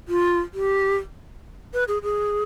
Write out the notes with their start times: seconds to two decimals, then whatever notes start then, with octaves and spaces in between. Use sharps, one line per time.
0.08 F4
0.54 G4
1.74 B4
1.88 G#4
2.03 G#4